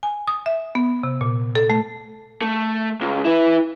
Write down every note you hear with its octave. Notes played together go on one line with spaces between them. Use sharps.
G#5
D#6
E5
B3
C3
A#2
A4
A3
A3
C#2
E4 B4